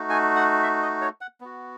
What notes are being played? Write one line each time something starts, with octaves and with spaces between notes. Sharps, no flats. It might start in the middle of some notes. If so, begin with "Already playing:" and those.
Already playing: A3 D#4 F#4
G#5
F#5
E5
D#5
C#5
F#5
B3 F#4